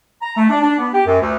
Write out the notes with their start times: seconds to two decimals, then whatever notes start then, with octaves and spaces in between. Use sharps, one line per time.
0.21 A#5
0.36 A3
0.49 D4
0.61 D4
0.78 B3
0.93 G4
1.05 F#2
1.20 D2